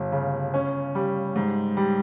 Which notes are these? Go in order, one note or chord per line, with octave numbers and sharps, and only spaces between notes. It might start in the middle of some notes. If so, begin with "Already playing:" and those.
Already playing: G1 G3
C#3
C#4
G3
G#2
G3